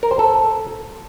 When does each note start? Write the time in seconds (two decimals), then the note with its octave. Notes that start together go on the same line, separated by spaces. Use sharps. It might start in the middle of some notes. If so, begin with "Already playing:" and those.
0.03 A#4
0.11 C5
0.19 A4